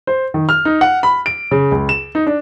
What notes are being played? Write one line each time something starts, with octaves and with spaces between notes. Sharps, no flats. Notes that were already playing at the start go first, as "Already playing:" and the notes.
C5
D#3
F6
D#4
F#5
B5
D7
C#3
C#2
E7
D#4
D4